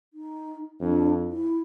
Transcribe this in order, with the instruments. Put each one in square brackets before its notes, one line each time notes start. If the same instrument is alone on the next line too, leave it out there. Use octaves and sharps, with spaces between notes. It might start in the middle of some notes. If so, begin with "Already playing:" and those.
[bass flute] D#4
[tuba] F2 [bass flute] D4
[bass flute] E4